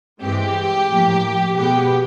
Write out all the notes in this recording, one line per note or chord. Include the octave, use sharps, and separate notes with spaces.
G2 E3 G#3 C4 G4
A2 F3 A#3
B2 G#3 B3 G4